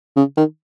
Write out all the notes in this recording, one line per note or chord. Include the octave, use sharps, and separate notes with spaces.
C#3
D#3